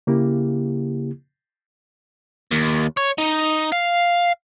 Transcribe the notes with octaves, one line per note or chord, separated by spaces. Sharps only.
C#3 A#3 E4 G4
D#2
C#5
D#4
F5